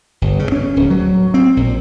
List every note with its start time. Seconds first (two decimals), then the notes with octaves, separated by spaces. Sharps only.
0.22 G1
0.39 C#3
0.52 C#4
0.76 D1
0.90 F#3
1.34 C4
1.57 A#1